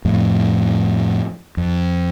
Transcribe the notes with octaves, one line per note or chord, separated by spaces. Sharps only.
F2 A2
F2